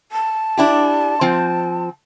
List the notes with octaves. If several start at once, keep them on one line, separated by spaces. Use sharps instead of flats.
A5
D4 E4 G4
F3 C4